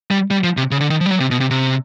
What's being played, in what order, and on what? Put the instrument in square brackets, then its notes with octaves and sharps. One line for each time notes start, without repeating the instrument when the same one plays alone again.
[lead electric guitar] G3
G3
F3
C3
C#3
D3
D#3
F3
G3
F#3
C3
B2
C3
C3